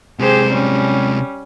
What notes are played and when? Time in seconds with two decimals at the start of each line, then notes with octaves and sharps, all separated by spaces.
0.19 C3 G#3 G4 G#4 C5
0.51 G3 C#4